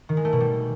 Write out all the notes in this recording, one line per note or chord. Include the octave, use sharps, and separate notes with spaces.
D#3
G#3
A3
B2
G3